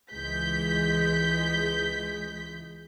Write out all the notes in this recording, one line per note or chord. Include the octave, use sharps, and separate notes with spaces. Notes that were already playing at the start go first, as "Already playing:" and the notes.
C#2 E3 G#3 G6 B6